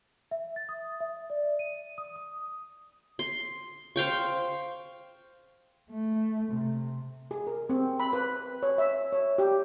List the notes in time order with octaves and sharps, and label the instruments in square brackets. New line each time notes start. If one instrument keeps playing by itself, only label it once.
[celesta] E5
A6
D#6
E5
D5
D#7
D#6
D#6
[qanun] C6
C5 F5 G5 C#6
[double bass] A3
C3
[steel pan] G#4
A#4
C4
B5
B4
C#5
E5
C#5
G4